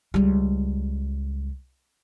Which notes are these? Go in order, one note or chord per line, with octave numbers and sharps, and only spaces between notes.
C#2 G3